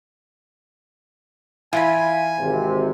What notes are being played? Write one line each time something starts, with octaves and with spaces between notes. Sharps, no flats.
E3 E4 F4 G#5 B5
G#1 C3